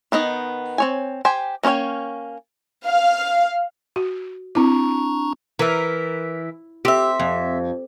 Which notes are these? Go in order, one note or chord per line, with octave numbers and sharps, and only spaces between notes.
D#3 B3 D#4 D#5
C4 C#5 G#5
G4 C5 G5 G#5
A#3 C#4 C5 C#5 G5
F5
F#4
C4 D4 E4 A#5 C#6
E3 A#4 E5
C4 G4 E5
F2